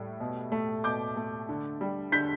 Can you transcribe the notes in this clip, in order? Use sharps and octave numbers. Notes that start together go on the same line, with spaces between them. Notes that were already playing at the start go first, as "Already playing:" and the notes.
Already playing: A2 G3
B2
A3
B2 D6 G6
A3
D3
G3
D3 G6 B6